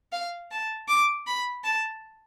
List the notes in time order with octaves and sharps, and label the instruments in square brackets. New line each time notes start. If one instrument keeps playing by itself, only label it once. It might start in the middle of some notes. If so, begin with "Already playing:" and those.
[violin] F5
A5
D6
B5
A5